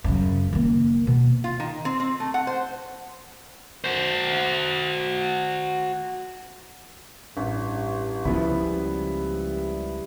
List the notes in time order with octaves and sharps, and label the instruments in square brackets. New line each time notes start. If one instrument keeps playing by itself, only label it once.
[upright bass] F#2 C#3
D#3 A#3
B2
[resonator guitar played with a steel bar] F4
D#3
C4
C4
A3
F#5
C5
[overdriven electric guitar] F#4 C5
[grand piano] A1 [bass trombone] G2
[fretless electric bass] C#2 C#3 F3 [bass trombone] G3 [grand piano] B3 E4